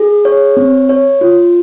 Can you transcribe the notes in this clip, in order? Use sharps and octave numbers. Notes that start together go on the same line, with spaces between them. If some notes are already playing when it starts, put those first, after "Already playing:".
Already playing: G#4
C#5
C4
C#5
F4